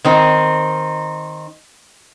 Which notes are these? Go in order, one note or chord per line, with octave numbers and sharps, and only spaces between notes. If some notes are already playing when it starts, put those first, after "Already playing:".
D#3 C4 D#4